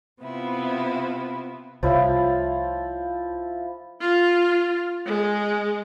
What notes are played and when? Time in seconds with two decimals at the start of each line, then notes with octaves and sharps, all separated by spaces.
0.21 C3 B3 E4 F4
1.83 C2 F3 E4 C5 C#5 F5
4.01 F4
5.06 G#3